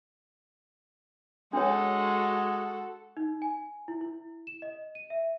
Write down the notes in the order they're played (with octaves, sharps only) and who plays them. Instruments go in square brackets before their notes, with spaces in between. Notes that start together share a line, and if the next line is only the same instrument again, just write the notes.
[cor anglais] G#3 [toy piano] D4 C#5 [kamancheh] F#4 A4
[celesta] D#4
G#5
E4
E4
E7
D#5
D#7
E5